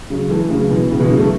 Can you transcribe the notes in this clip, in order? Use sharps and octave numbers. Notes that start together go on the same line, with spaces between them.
C#3 F#3
E3 A3
C#3 F#3
B2 E3
A2 C#3
B2 E3
C#3 F#3
E3 A3